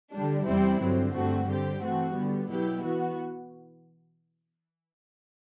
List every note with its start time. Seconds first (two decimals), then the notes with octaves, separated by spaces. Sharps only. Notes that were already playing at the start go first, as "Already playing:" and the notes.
0.13 D3 G3 D4
0.46 E2 C3 G3 C4 E4
0.81 G2 D3 F#3 C4
1.14 G2 D3 A3 C4 F#4
1.48 D3 G3 C4 G4
1.82 E3 A3 C4 F#4
2.15 D3 G3 B3
2.49 B2 F#3 B3 E4 G4
2.83 E3 B3 F#4